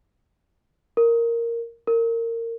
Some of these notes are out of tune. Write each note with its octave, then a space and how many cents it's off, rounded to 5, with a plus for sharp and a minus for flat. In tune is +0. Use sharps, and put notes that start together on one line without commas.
A#4 -5
A#4 -25